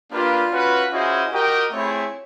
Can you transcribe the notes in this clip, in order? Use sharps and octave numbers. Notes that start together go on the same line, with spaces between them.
A#3 D4 F4 G4 B4
C#4 F#4 B4
C#4 E4 F#4 G#4 C5 D#5
F#4 G4 A#4 D#5 G5
A3 C4 E4 G#4 C#5